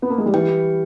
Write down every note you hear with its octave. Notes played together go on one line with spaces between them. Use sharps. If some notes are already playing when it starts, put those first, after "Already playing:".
B3
A#3
G#3
G3
E3 G4 B4 G5